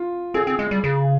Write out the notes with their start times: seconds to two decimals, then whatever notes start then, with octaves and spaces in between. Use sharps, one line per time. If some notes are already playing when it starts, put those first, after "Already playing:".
Already playing: F4
0.34 C4 G#4
0.47 C4
0.59 G#3
0.71 G3
0.84 C#3